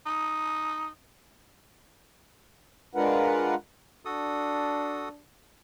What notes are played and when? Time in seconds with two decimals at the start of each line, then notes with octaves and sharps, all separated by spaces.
0.06 D#4
2.95 G#3 D4 F4 A#4 B4 F#5
4.05 D4 F#4 A4 D#6